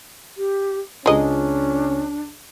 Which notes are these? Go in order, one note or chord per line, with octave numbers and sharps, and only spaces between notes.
G4
C#2 G#3 C#4 D4 F4 D#5 A#5